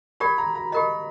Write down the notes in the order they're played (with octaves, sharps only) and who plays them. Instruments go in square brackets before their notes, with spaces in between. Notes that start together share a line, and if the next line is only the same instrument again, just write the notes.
[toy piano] G4 A#4 D5 [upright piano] B5
[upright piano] A#5
A#5
[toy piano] G4 A#4 D#5 [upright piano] B5